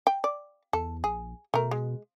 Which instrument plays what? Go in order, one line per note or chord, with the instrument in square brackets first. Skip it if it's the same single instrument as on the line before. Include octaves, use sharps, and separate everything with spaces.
[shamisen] G5
D5
[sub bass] E2 [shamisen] A4
[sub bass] A#1 [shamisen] G#4
[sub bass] B2 [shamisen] A3 A#4
[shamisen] G#3